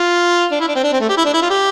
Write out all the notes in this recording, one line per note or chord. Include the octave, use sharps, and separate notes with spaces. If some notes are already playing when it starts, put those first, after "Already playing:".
Already playing: F4
D4
E4
D4
C4
D4
C4
A3
G4
E4
D4
E4
F4
G4